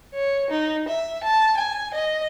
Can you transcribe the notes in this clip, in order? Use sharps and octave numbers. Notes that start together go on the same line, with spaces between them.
C#5
D#4
E5
A5
G#5
D#5